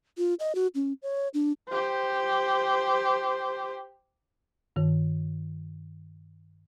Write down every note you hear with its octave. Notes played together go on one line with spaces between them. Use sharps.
F4
D#5
F#4
C#4
C#5
D4
G4 C5
G2 D#3